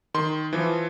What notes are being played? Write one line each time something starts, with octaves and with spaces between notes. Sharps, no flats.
D#3 C6
E3 F3